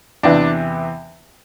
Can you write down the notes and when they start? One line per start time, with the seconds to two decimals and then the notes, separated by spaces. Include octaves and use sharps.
0.23 E2 C3 E3 D4